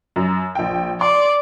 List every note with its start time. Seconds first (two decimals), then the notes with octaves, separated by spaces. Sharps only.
0.16 F#2 A#5
0.55 A#1 G5
1.01 D5 C6